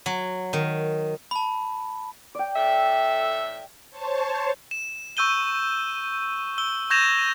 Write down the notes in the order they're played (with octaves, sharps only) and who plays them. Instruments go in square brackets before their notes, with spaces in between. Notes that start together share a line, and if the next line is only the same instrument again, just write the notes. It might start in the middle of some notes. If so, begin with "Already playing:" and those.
[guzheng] F#3
D#3
[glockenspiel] A5 B5
[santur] D5 G5
[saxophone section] A2 A4 E5
[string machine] C5 C#5 A5
[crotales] E7
C#6 E6 G6 D#7 G7
E6 G7
C#6 G6 G#6 A#6 E7 F7